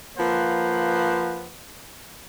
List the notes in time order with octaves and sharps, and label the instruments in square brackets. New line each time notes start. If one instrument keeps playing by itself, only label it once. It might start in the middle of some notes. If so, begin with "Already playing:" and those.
[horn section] F3 A#3 B4 C5 F#5